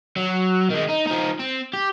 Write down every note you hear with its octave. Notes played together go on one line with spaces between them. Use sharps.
F#3
D#3 G#3
D#4
F3 D#4
C4
G4